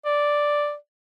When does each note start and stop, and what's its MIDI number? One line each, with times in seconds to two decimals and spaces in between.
0.06 0.75 74